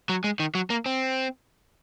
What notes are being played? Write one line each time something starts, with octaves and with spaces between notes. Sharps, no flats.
F#3
G#3
D#3
F#3
A#3
C4